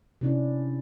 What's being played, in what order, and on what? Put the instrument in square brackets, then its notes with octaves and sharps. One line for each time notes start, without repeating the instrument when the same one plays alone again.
[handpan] C3 C#4 D4 E4